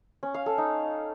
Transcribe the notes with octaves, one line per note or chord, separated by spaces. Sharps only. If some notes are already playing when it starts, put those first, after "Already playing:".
C#4
F5
A4
D#4